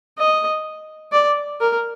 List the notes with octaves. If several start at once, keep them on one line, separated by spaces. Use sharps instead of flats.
D#5
D5
A#4